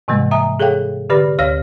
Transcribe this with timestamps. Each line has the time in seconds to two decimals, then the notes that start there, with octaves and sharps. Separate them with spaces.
0.08 G#2 C3 E3 G3 G#3 A#3
0.31 E5 G#5 A#5 D#6
0.60 G#4 A4 C#5 F5 G5
1.10 D3 G4 B4 D5 B5 A#6
1.39 D2 C#5 F5 E6 F6 A#6